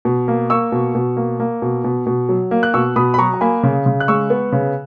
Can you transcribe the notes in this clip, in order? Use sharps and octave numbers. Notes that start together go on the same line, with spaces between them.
B2
A#3
A#3 C#6 E6
B2
B2
A#3
A#3
B2
B2
B2
F#3
A#3
F#6
B2 C#6 E6
B2 B5 D#6
B5
F#3 A#5 C#6
A#5
A#3 G#5 B5
C#3
C#3
F#6
G#3 C#6 E6
B3
C#3